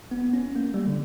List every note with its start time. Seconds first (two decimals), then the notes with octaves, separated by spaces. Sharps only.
0.11 B3
0.33 C#4
0.56 A#3
0.74 G3
0.87 D3